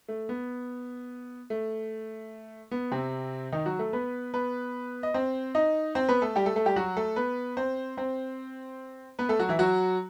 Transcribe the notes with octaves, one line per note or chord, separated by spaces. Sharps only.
A3
B3
A3
B3
C3 C4
D#3 D#4
F#3 F#4
A3 A4
B3 B4
B3 B4
D#5
C4 C5
D#4 D#5
C4 C5
B3 B4
A3 A4
G3 G4
A3 A4
A3 A4
G3 G4
F#3 F#4
A3 A4
B3 B4
C4 C5
C4 C5
B3 B4
A3 A4
F#3 F#4
E3 E4
F#3 F#4